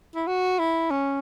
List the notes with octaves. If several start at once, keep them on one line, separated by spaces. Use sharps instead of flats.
E4
F#4
E4
C#4